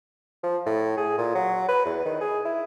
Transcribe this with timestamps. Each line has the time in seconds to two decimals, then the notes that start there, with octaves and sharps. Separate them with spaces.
0.43 F3
0.66 A2
0.97 G#4
1.18 A#2
1.35 F#3
1.68 B4
1.85 E2
2.05 D#3
2.21 G#4
2.45 E4